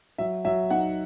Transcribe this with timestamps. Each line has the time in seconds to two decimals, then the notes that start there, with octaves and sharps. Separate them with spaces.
0.18 F#3 E5
0.45 F#3 E5
0.70 D#4 F#5